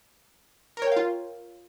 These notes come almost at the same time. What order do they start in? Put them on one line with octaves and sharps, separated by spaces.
A#4 C#5 G5 F5 F4